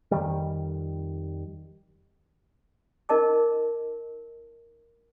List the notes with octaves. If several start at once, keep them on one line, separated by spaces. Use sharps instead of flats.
F2 D#3 G3
D#4 A#4 D#5 A5 D6